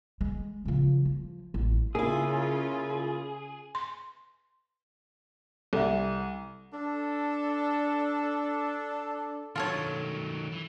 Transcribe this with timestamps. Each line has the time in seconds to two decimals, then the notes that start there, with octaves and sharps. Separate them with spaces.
0.21 G#3
0.65 C#3 F3
1.05 F3
1.54 A1
1.95 C#3 A#3 E4 F4 G#4
3.75 C6
5.73 C2 A4 E5
6.73 D4 A4
9.56 D#3 F#3 F4 A4 C#5
10.52 E3